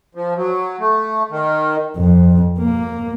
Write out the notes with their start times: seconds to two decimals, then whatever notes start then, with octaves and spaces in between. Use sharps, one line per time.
0.15 F3
0.37 F#3
0.80 A3
1.31 D#3
1.97 F2
2.59 A#3